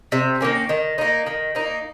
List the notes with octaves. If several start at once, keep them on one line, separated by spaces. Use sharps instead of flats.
C3
D#3 A#3 C#4
D#3
A#3 D#4
D#3
A#3 D#4